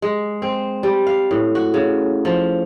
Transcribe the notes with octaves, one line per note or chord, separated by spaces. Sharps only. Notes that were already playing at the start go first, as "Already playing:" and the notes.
G#3
C4
G3
F5
A2
F#4
C#3
F3